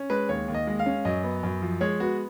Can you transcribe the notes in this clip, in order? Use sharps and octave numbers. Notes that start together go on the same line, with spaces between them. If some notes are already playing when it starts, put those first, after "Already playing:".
Already playing: C#4
G#3 B4
D#2 C#5
D#2
D#5
G#3
F5
C#4
F#2 D#5
B3
F#2
F3
G#3 C#5
B3 F#4